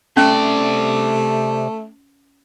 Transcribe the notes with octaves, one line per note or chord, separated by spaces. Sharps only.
C3 A3 C#4 D5